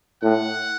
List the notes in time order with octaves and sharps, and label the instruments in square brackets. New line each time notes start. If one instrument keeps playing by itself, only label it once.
[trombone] A2 [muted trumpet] F#5